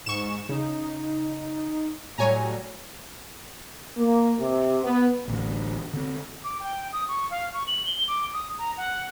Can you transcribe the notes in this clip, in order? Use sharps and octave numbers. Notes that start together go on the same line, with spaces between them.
G#2 C#6 E7
C#3 D#4
A2 F#3 G3 C#5 G#5 A#5
A#3
C3
B3
D1 A1 D2
D3 C4
D6
G5
D#6
C#6
F5
C#6
F#7
G7
D6
D#6
A#5
F#5